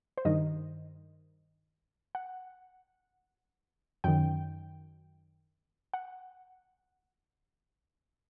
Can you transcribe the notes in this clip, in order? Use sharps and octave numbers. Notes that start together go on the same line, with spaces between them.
C5
G2 D#3 D#5
F#5
F#2 D#3 G5
F#5